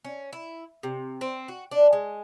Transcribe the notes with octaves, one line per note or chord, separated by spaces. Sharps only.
C#4
E4
C3
C4
F#4
D4
G#3